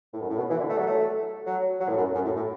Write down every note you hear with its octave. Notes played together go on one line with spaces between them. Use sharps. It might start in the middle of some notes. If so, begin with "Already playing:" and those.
A2
F#2
A2
B2
E3
D3
A3
F#3
A3
F#3
F#3
A2
F#2
F#2
A2
A2